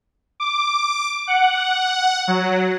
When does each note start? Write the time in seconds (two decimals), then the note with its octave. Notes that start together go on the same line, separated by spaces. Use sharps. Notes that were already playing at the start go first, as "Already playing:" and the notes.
0.40 D6
1.27 F#5
2.28 F#3